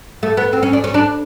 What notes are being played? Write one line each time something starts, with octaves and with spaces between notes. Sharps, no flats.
A3
B3
C4
C#4
D4
C#4
D4